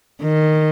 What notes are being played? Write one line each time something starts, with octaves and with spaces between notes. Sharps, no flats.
D#3